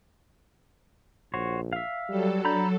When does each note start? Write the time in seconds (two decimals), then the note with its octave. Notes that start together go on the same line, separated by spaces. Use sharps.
1.34 A#1 F#4 C5 C#5
1.73 E5 F5
2.09 F#3 G3 A4
2.45 D4 A#5 B5 G6